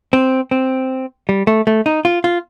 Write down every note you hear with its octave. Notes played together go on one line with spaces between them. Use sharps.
C4
C4
G3
A3
A3
D#4
F4
F4